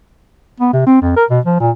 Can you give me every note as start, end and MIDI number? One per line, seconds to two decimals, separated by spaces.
0.60 0.72 59
0.73 0.82 48
0.87 1.00 60
1.02 1.17 41
1.17 1.25 70
1.30 1.40 47
1.45 1.57 53
1.60 1.71 46